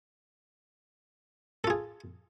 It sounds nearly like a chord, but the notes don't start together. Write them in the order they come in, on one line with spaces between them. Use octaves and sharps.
A4 F4 G#4